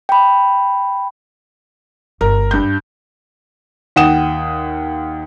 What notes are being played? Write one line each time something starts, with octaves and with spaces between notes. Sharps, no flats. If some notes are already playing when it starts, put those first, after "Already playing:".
G5 B5
G1 A#4
G2 G6
D#2 F#5 G5 D#6 E7